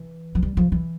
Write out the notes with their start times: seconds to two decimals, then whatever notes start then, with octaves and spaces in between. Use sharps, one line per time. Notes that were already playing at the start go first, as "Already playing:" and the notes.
Already playing: E3
0.35 F3
0.43 G3
0.57 F3
0.72 E3